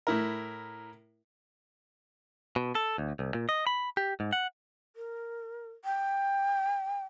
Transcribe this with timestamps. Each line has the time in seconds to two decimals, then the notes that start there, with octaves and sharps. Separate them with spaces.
0.07 A2 E4 A#4
2.56 B2
2.75 A4
2.98 D2
3.19 C2
3.34 A#2
3.49 D#5
3.67 B5
3.97 G4
4.20 G#2
4.33 F#5
4.96 A#4
5.85 G5